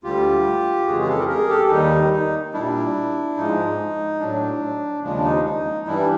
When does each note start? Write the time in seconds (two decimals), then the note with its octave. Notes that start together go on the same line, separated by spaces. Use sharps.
0.03 D2 D3 G3 F4 G4
0.87 F2 C#3 E3 G#3 F#4 G#4
1.01 G#4
1.08 G4 A4
1.18 G#4 A#4
1.28 G#4 A#4
1.49 G4 A4
1.70 D#2 D#3 G3 D#4
2.13 D#4
2.54 A#2 G3 D4 E4
3.37 G#2 F3 G#3 D#4
4.20 A2 F#3 D4
5.04 D#2 C#3 F3 G#3 D4
5.24 D#4
5.45 D#4
5.86 G2 E3 G3 D4 E4